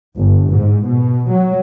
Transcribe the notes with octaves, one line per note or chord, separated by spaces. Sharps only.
G1
G#2
B2
F#3